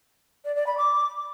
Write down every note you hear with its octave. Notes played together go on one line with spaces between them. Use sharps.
D5
D5
B5
D6